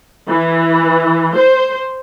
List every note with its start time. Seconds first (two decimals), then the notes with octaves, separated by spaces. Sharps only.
0.30 E3
1.38 C5